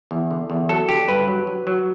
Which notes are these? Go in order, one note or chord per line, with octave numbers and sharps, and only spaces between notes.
E2
D3
E2
F#3 A4
D3 G4
G2 B4
F#3
F#3
F#3